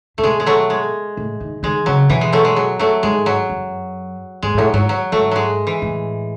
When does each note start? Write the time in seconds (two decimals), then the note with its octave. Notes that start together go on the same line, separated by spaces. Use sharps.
0.18 A2 A3
0.23 B2 G#3
0.40 G#3
0.46 F#3 A3
0.70 G#3
1.17 A2
1.40 D#3
1.63 D#3 G#3
1.86 C#3 F#3
2.09 B2 E3
2.21 G#3
2.33 F#3 A3
2.45 G#3
2.56 F#3
2.79 F#3 A3
3.03 G#2 G#3
3.26 F#3
3.50 F#2
4.42 G#2 G#3
4.54 G#2
4.57 A2 F#3
4.73 G#2 F#3
4.89 F#3
5.12 G#2 F#3 A3
5.31 F#3 G#3
5.67 E3
5.82 A2